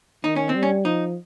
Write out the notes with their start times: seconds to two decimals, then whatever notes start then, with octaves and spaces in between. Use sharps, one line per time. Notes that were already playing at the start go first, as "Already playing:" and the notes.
0.24 D#3 D#4
0.36 C#4
0.49 C4
0.55 G3
0.63 C#4
0.85 F3 D#4